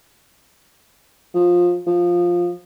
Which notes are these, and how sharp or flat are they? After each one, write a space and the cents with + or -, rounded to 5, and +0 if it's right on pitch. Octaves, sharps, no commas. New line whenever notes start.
F3 +15
F3 +5